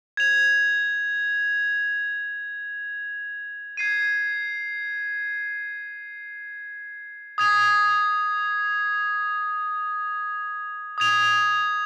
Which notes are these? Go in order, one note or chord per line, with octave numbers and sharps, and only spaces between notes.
G#6 F7
G#6 C7 D#7
D#6 G#6 F7
D#6 G#6 F7